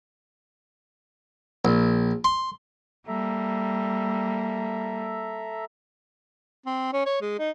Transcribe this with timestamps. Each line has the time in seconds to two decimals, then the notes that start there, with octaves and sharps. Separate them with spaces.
1.65 A#1
2.24 C6
3.08 G3 A#3 A4 E5 A#5
6.66 C4
6.93 C#4
7.06 C#5
7.22 G#3
7.39 D#4